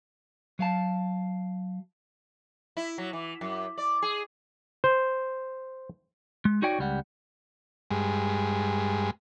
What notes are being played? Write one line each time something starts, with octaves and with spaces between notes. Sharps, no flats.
F#3 F5 A5
E4
F#3
E3
F#2
D5
G#4
C5
G#3
D#4 F#4 C#5 D5 G5
C#2 G3 F#5
G2 G#3